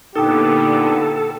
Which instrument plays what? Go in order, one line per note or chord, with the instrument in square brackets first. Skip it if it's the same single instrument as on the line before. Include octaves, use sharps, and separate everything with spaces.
[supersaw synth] A#2 D3 B3 [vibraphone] D#4 G5 [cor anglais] G4 [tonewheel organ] A4